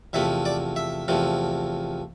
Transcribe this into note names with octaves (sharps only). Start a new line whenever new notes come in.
E2 C3 F3 A3 E5
D5
E5
E2 C3 F3 A3